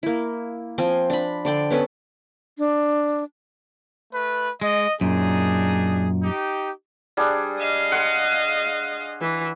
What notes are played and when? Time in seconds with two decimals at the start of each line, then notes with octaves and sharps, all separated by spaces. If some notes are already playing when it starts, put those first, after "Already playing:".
0.03 A#3 E4
0.78 F3 C4 G5 G#5
1.10 D4 B5
1.45 D3 D5 G5
1.70 B3 C#4 A4 B4
2.58 D4
4.13 A3 B4
4.61 G#3 D#5
5.01 F#2 A#2 D4 D#4 G#4
6.23 D#4 G4
7.17 G3 D4 G#4
7.59 D#5 F5
7.92 F#5 C6
9.21 E3